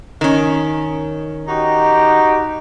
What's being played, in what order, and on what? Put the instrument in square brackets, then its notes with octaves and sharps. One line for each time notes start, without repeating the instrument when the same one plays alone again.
[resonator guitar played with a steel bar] D#3 C#4
[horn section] D#4 F#4 G4